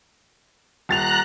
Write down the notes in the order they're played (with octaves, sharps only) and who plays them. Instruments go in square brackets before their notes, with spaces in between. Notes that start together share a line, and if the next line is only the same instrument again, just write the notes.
[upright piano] D#1 A6 F7 [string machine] A#5 F#6